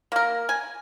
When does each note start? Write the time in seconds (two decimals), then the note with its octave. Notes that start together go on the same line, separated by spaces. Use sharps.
0.12 A#3 A#4
0.49 G#5